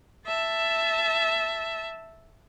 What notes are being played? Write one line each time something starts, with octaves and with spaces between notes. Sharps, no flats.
E5 A5